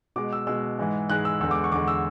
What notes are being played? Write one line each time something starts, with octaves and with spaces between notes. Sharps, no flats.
B2 G#3 D6
E6
B2 G#3 E6
G#2 E3 G#3
G#2 E3 G#3 F#6
E6
E2 D3 G#3 E6
D6
C#6
E2 D3 G#3 D6
E6